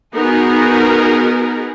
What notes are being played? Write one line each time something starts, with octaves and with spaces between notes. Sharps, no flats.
B3 D#4 F#4 G#4 A#4